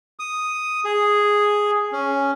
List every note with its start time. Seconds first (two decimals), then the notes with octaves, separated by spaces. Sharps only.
0.19 D#6
0.85 G#4
1.92 C#4